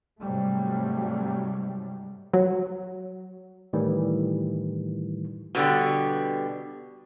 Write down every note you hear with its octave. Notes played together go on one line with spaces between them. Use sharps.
G#2 C3 F#3 G3 A3
F#3
A2 D#3 E3 G3
B2 D3 G3